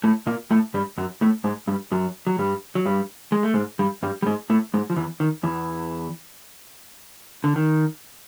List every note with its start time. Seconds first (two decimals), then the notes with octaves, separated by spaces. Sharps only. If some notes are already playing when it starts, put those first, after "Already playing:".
0.04 A2 A3
0.27 A#2 A#3
0.51 A2 A3
0.74 G2 G3
0.98 F#2 F#3
1.21 A2 A3
1.44 G#2 G#3
1.67 G2 G3
1.92 F#2 F#3
2.27 F#3
2.39 G2 G3
2.75 F#3
2.86 G2 G3
3.32 G#3
3.43 A3
3.54 G#2 G#3
3.79 G2 G3
4.03 G2 G3
4.22 G3
4.26 G#2 G#3
4.50 A2 A3
4.74 G#2 G#3
4.90 F3
4.97 E2 E3
5.20 D#3
5.43 E2 E3
7.44 D3
7.56 D#3